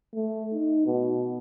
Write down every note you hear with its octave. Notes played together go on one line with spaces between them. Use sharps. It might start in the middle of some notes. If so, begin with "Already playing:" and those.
A3
D#4
B2